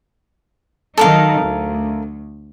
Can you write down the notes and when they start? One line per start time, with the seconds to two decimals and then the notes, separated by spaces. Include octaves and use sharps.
0.98 D#3 F#3 D#4 A4 A#4 F5
1.42 D2